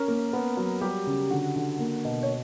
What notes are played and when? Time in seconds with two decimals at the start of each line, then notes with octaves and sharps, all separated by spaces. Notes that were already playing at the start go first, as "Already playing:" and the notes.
Already playing: C#4 A#4
0.08 A#3
0.33 B3
0.57 F#3
0.81 G3 G4
1.07 C#3
1.30 D3 F#4
1.56 D3
1.79 A#3
2.05 B2
2.23 C#5